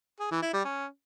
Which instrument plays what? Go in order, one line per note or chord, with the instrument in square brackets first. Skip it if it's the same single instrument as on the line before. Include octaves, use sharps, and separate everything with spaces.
[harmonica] G#4
E3
E4
G3
C#4